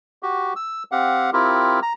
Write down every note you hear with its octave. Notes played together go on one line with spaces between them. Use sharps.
F#4 G4
E6
C4 G4 F5 F#5
C4 E4 F4 G4 A#4
A#5